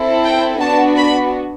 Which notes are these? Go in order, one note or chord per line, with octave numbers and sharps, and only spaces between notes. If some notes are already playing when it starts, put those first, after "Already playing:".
Already playing: C4 E4 A4
G5
B3 D4 F#4 A5
B5